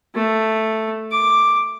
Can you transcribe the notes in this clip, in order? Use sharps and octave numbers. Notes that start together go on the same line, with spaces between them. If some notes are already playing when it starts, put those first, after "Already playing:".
A3
D6